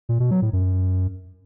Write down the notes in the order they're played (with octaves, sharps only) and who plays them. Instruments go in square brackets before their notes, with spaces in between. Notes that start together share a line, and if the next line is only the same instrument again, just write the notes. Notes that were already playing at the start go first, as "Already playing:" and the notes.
[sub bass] A#2
B2
F#3
A2
F#2